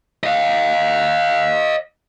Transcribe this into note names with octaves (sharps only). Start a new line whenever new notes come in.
D#5 F5